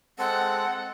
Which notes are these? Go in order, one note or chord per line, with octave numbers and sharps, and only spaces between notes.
G#3 C4 A4 F#5